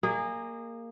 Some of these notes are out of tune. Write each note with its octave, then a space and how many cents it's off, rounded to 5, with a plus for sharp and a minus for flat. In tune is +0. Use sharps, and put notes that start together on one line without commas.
A#3 -10 G#4 -25 D#5 -20